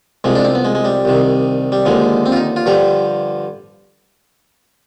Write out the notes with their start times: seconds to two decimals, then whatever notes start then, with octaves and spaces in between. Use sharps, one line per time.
0.24 C2 C3 F3 G#3
0.35 D4
0.44 C4
0.55 B3
0.65 G#3
0.75 G#3
0.85 G3
1.05 C2 C3 D#3
1.72 G3
1.85 D#2 D3 F3 G#3
2.26 C4
2.32 F4
2.36 D#4
2.56 F4
2.66 G2 D3 F3 G4